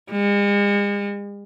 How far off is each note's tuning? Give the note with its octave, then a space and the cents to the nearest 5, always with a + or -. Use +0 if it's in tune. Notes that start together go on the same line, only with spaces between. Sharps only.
G#3 -45